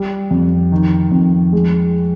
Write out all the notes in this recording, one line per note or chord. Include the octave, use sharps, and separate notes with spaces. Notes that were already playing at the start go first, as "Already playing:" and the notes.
Already playing: G3
F2
D#3
F2
G#3